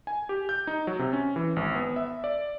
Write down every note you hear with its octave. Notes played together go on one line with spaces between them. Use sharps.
G#5
G4
G6
D#4
F#3
C3
C#4
E3
G#1
B3
E5
D5